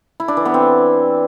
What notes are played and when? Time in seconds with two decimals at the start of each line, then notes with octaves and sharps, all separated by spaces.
0.20 E4
0.28 D4
0.37 E3
0.45 B3
0.54 C4